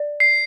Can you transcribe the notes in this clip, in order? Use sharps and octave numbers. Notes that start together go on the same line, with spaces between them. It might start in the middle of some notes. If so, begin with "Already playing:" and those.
Already playing: D5
C7